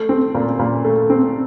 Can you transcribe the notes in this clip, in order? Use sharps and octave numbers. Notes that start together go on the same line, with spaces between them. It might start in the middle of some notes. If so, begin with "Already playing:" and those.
Already playing: A3
C4
A#2
A#2
A3
C4